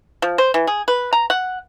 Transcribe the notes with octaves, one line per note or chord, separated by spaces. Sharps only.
F3
C5
E3
G#4
B4
A#5
F#5